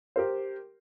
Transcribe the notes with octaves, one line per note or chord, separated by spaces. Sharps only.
G4 A#4 C5